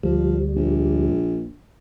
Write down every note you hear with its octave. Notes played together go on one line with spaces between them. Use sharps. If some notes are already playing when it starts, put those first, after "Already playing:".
D2 F3 G3
A#1